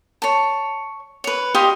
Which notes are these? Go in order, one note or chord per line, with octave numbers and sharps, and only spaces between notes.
C#5 A5
B4 C#5
G4 D#5 F5 C6